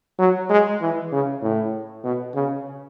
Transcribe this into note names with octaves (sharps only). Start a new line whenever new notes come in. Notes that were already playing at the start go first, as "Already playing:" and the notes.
F#3
G#3
E3
C#3
A2
B2
C#3